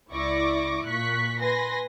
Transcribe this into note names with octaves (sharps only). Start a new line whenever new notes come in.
C#2 E4 D5 C#6 D6 A#6
A#2 C#6 F#6 B6
B4 G#5 C6 A#6